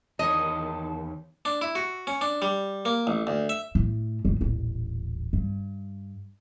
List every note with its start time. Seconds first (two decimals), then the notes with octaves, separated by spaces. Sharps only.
0.19 E2 D#3 C#5 D#5 A5
1.45 D4
1.61 E4
1.75 F#4
2.07 C#4
2.21 D4
2.42 G3
2.85 A#3
3.07 A1
3.27 D2
3.49 E5
3.75 A2
4.25 F1 A2
4.41 D#1 A1
5.33 G2